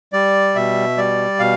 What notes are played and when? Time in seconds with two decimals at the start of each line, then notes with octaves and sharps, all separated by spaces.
0.13 G3 D5
0.55 B2 E5
0.97 G3 D5
1.39 B2 F5